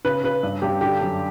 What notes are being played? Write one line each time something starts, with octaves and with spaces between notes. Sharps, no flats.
C#3 B4
C#3 B4
G2
G2 G4
D3 G4
F#2